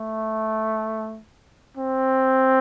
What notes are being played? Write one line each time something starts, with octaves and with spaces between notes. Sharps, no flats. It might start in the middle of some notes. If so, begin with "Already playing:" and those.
Already playing: A3
C4